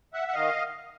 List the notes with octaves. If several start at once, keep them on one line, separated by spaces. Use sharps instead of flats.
E5 F#5
F#5
D#3 D#5 F5